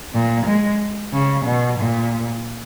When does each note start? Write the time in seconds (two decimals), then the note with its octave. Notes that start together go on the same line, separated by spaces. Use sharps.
0.14 A#2
0.46 G#3
1.13 C#3
1.46 B2
1.79 A#2